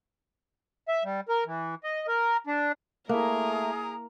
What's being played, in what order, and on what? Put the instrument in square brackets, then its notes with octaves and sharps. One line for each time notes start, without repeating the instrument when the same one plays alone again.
[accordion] E5
G3
A#4
E3
D#5
A#4
D4
[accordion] A3 [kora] A#3 E4 [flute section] G#4 A#5 D#6 [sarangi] A#4